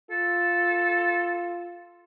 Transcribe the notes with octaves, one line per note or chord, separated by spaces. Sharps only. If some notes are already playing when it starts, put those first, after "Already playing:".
F4 A4